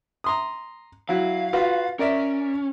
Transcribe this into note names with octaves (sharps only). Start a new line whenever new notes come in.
A#5 C6 D#6
F#3 E4 F#4 F5
F4 F#4 B4
C#4 A#4 D5 E5